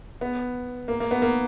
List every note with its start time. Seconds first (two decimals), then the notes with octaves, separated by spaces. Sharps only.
0.21 B3
0.88 A#3
1.00 A#3
1.11 B3
1.22 A#3